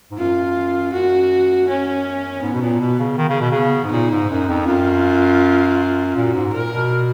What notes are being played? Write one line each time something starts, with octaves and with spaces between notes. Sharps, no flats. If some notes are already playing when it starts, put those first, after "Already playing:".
G#2
F#2 F4
F#2 F#4
C#4
G#2 B3
B2
A#2
B2
C#3
D#3
C#3
B2
C#3 B3
G#2
A#2 D#4
G#2
F#2
F2
F#2 F4
A#2 F#4
G#2
A#2 A#4
B2